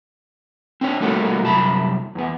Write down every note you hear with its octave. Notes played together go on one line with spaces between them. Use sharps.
C4 D4 C#5
F3 G3 A3 A#3 F4 F#4
C2 F#2 A5 B5
E2 B3